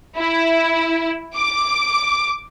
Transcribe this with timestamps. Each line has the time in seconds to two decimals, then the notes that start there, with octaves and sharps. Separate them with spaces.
0.18 E4
1.36 D6